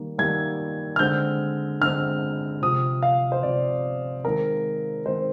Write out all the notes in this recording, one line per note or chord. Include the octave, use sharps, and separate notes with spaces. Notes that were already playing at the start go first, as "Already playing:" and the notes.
Already playing: D#3 G3 A#3
D#3 G3 A#3 G#6
F6
D3 G#3 C4 G6
D3 G#3 C4 F6
C3 F3 C4 D#6
F5
C5
C3 F3 C4 D5
D#3 G#3 C4 A#4
D#3 G#3 C4 C5